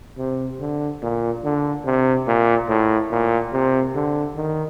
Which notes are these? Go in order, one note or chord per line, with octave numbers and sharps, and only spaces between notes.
C3
D3
A#2
D3
C3
A#2
A2
A#2
C3
D3
D#3